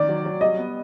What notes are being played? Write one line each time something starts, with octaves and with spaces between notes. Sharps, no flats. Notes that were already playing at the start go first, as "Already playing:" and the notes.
Already playing: D#3 D5
F#3
F#3
G3 D#5
B3